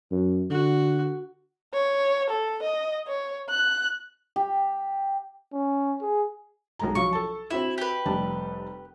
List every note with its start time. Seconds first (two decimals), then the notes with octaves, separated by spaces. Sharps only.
0.11 F#2
0.50 D3 F#4
1.74 C#5
2.30 A4
2.63 D#5
3.08 C#5
3.50 F#6
4.36 G4
5.53 C#4
6.02 G#4
6.79 B1 G#3 A#5
6.95 F3 F#3 F5 C#6
7.13 A4 A5
7.51 C4 E4 F#4 E5
7.78 G4 B4
8.06 F1 G3 A5